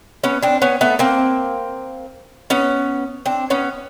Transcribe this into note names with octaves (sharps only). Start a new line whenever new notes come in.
B3 C#4
C4 D4
B3 C#4
A3 B3
A#3 C4
B3 C#4
C4 D4
B3 C#4